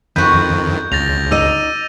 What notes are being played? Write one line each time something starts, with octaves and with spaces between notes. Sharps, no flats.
F2 D#3 F#4 B4 G6
C#2 A6 A#6 F7
D#4 D#5 D6 E6 D#7